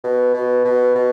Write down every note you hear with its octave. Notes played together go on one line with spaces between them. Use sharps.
B2
B2
B2
B2